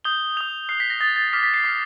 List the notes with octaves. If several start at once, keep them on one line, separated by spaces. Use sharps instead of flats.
D#6 G6 G7
D#6 G6 F7
D#6 F#6 C7
B6
A#6
D#6 F#6 A6
A6
D6 F6 B6
B6
C7
D6 F6 B6